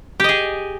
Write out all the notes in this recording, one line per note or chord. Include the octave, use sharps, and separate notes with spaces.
G4 G#4 D#5